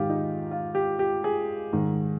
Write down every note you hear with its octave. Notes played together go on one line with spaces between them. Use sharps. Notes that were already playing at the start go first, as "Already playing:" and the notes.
Already playing: G#2 D#3 F4 G4
D#4
F4
G4
G4
G#4
G#2 D#3